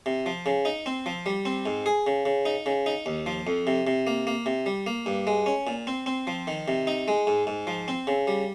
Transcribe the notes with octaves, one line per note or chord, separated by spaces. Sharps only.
C3
F3
C#3
D#4
C4
F3
G3
C4
G#2
G#4
C#3
C#3
D#4
C#3
D#4
D#2
F3
F2
C3
C3
A#3
A#3
C3
G3
A#3
G2
G#3
C#4
A#2
C4
C4
F3
D#3
C3
D#4
G#3
G#2
G#2
F3
C4
C#3
G3